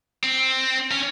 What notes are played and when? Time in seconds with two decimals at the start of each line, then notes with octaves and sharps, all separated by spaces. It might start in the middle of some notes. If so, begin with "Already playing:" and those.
0.23 C4
0.91 C#4